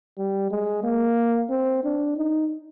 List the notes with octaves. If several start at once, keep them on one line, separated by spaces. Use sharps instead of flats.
G3
G#3
A#3
C4
D4
D#4